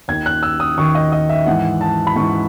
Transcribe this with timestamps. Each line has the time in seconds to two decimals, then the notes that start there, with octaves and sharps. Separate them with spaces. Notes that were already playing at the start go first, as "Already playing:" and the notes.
0.08 D#2 D#3 G#6
0.26 F#6
0.43 E6
0.60 D#6
0.78 D#2 D#3 C#6
0.95 D#5
1.12 D#5
1.29 E5
1.46 G#2 E3 F#5
1.81 A5
2.07 B5
2.16 G#2 E3 C#6